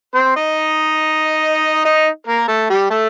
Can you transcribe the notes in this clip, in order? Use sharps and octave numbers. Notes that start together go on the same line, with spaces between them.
C4 C5
D#4 D#5
D#4 D#5
A#3 A#4
A3 A4
G3 G4
A3 A4